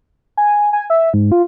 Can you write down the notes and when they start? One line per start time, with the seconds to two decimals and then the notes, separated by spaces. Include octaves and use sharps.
0.37 G#5
0.73 G#5
0.90 E5
1.14 G#2
1.32 F4